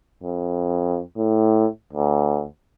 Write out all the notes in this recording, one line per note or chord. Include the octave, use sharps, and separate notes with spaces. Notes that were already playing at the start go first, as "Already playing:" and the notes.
F2
A2
D2